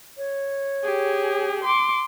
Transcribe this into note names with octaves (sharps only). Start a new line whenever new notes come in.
C#5
G4 G#4
C6 D6